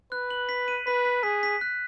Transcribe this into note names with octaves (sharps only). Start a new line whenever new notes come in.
B4 F#6
F#7
B6
D#7
B4 B6
B6
G#4 B6
B6
F#6